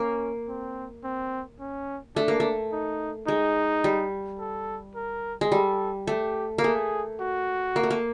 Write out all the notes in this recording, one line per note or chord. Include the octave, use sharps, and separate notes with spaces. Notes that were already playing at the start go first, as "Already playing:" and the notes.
Already playing: A#3 C#4
C4
C4
C#4
A3 D4
A#3
A3
D#4
G#3 D#4
G3
A4
A#4
G#3
G3 A4
A3 G4
A#3
A3 G#4
F#4
A#3
A3
A#3